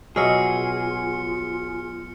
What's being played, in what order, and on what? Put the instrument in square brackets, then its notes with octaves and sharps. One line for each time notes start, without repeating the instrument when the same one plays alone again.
[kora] B2 F#3 E5 [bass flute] F4 [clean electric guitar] G#4 [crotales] F6 C#7